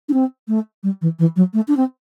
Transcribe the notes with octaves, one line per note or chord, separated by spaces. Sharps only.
D4
C4
A3
G3
E3
E3
F#3
A3
D4
C4